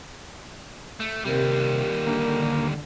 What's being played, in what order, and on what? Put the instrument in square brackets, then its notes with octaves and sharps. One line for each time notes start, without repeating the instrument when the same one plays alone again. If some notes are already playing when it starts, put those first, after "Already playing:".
[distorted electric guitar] A3
[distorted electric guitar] D#2 G3 [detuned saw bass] C3 [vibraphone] G4 A#4
[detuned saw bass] D3 [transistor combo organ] A#3